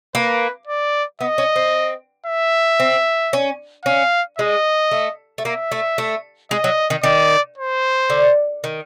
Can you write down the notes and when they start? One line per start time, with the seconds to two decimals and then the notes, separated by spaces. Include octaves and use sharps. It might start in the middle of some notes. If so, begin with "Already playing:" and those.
0.15 A#3 B4
0.67 D5
1.21 B3 D#5
1.38 C#4
1.56 C4
2.26 E5
2.80 C4
3.33 C#4
3.85 C#4 F5
4.39 G#3 D#5
4.91 A3
5.38 A3
5.45 A#3 E5
5.72 A3
5.98 A3
6.51 G#3 D#5
6.64 F#3
6.90 D#3
7.03 D#3 D5
7.58 C5
8.10 D3
8.64 D#3